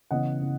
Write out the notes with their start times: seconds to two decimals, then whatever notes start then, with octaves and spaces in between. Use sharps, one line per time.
0.11 C#3 E3 B3 D#5 F#5
0.41 C#3 E3